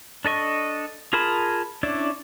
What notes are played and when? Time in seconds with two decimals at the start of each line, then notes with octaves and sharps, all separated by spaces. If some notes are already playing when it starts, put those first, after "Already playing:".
0.25 D4 A4 D#5 C#6
1.13 F4 G#4 A#4 A5 B5
1.83 C#4 D4 E4 D5